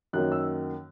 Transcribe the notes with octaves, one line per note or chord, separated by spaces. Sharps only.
F#2 D#3 F#3 A#3 F#6
E6